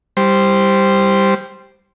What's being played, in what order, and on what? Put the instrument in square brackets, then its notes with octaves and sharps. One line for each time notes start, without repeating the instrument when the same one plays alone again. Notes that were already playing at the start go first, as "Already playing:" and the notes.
[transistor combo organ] G3 C5